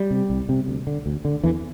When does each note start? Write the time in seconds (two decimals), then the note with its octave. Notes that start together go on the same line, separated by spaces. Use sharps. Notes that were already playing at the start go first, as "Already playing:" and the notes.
Already playing: G3
0.11 C3
0.30 C2
0.49 C3
0.68 D2
0.87 D3
1.06 D2
1.25 D3
1.44 E2 E3